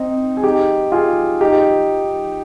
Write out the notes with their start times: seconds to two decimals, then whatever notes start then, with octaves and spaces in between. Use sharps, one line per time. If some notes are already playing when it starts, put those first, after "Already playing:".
Already playing: C4 D#4
0.37 G#4
0.44 D#4 G4
0.92 F4 G#4
1.41 D#4 G4